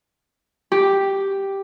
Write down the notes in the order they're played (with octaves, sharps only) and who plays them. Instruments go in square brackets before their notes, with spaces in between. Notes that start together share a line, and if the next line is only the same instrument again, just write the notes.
[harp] G4